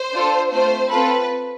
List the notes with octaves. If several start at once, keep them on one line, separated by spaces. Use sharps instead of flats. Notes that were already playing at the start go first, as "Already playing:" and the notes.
Already playing: C5
D4 F4 A4
A3 C4 F4 C5
C4 F4 A4 B4